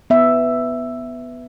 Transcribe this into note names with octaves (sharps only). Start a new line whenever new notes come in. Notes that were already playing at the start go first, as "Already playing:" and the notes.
B3 E5